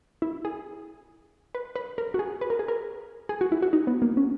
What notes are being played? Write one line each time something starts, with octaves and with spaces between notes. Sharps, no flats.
E4
G#4
B4
B4
A#4
F#4
G#4
B4
A#4
G#4
A#4
G#4
F#4
E4
F#4
D#4
B3
A#3
C#4